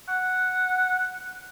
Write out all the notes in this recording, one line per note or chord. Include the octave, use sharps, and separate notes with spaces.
F#5